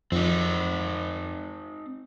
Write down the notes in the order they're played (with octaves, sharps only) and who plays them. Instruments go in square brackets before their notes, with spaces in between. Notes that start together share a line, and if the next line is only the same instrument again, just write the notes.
[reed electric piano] F2 [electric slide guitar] C4 D#4